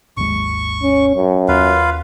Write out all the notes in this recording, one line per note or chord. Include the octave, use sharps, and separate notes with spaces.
G#1 D#2 G#3 C#6
C#4
F#2
D#2 F4 B4 F5